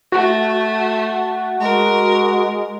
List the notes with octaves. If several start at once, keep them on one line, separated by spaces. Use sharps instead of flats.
A3 F#4
G#3 A#4